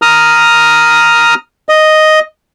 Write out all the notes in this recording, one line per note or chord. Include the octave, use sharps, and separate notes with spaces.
A#5 D#6 F6
D#5